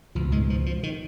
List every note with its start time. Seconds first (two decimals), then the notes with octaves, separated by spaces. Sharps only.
0.15 C#2 B2 F3
0.32 G#2 G#3
0.50 F3
0.66 F3
0.83 D#3